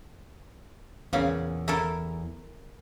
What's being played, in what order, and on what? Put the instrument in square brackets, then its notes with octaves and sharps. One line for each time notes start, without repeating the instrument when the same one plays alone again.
[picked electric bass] E2 [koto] A#2 C#3 C#4
[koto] E4 A4 A#4